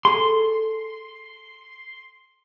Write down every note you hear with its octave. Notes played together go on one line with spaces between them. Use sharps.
G#4 A4 C6